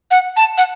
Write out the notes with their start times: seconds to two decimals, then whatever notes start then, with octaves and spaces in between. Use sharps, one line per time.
0.11 F#5
0.36 A5
0.57 F#5